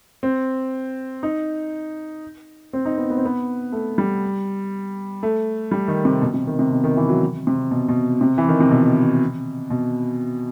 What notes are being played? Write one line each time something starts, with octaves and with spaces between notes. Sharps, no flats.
C4
D#4
C4
D#4
B3
B3
C4
B3
A3
G3
A3
G3
D#3
C3
B2
C3
D#3
C3
B2
D#3
E3
F#3
C3
B2
B2
C3
E3
D#3
C3
B2
B2